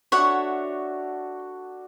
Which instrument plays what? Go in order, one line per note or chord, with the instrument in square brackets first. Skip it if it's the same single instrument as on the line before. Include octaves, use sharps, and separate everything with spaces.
[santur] D4 F#4 A4 [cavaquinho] C#5 E5 F#5